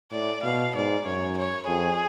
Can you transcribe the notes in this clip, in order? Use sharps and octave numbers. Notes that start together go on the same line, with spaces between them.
A2 D5
B2 F5
G#2 D5
F#2 C#5
C#5
F2 G#4